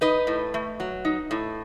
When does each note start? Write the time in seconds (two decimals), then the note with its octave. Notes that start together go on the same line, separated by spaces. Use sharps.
0.01 D#4 B4 D#5
0.27 A2
0.54 A3
0.80 F#3
1.05 D#4
1.31 A2